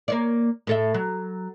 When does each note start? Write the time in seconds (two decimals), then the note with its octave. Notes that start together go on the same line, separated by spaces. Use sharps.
0.08 A#3 C#5 D5
0.67 A2 A4 E5
0.94 F#3